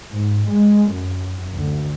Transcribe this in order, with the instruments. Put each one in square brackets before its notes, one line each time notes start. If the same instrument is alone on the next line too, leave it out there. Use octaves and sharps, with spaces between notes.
[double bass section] G#2
G#3
F#2
D2